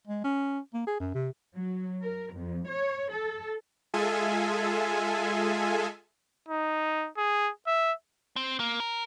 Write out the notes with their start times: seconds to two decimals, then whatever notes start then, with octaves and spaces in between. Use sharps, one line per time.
0.07 G#3
0.24 C#4
0.74 A#3
0.87 G#4
0.99 F#2
1.14 C3
1.55 F#3
2.03 A#4
2.33 F2
2.68 C#5
3.11 A4
3.94 G#3 F4 G#4 A4 E5 G#5
6.48 D#4
7.17 G#4
7.67 E5
8.36 C4
8.60 A#3
8.80 A#4